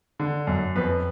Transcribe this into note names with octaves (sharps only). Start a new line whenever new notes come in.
D3
F#2
F2 B4